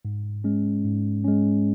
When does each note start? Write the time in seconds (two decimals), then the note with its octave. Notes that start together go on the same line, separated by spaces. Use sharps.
0.05 G#2
0.44 G#3 C#4
0.84 G#2
1.24 G#3 C#4